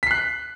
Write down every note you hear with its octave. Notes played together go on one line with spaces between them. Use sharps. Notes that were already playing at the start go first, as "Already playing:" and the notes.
F#6 B6 C7